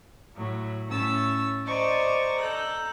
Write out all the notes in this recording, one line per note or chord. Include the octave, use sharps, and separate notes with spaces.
A2 F#3
A2 C#4 C#5 A5 E6
C5 D5 D#5 A5 A#5 C#6
A4 A#5 F#6 G6